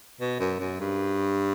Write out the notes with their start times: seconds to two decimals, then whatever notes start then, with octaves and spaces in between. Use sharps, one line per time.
0.21 B2
0.40 F#2
0.60 F#2
0.80 G2